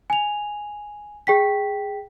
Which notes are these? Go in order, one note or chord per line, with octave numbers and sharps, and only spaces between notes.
G#5 F7
G#4 G5 B6